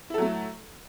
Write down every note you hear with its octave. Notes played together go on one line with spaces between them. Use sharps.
F#3 A3 E4 A4